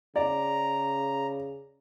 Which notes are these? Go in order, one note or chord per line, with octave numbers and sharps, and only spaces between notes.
C#3 D5 A#5